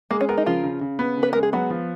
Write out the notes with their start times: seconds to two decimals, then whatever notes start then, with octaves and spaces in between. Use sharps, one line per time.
0.11 G#3 A#3
0.21 C#4
0.29 B3 A#4
0.37 D#4
0.46 C#3 F3 F4
0.64 C#3
0.81 C#3
0.99 B3
1.17 C#3
1.23 B4
1.33 G#3 A#4
1.43 G#4
1.53 F#3 B3 F#4
1.70 F3